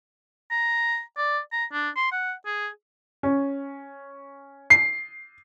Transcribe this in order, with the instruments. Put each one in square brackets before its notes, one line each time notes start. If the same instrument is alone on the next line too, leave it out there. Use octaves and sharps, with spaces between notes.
[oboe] A#5
D5
A#5
D4
C6
F#5
G#4
[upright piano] C#4
C7